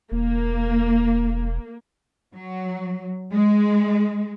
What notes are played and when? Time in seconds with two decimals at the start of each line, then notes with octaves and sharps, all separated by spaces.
0.12 E1 A#3
2.33 F#3
3.32 G#3